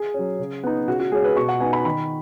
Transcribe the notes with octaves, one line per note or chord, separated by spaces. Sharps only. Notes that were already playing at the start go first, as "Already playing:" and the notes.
Already playing: G#4
F#3 C#4
C#3
B3 D#4
C#3 F#4
F#4
G#3 C#4 G#4
B4
B2 C#6
F#5
B3 D#4 G#5
B5
D#3 B5